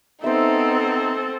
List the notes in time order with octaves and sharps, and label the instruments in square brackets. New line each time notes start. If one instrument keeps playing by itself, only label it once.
[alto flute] B3 [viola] C4 A4 [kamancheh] D#4 [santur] C5 E5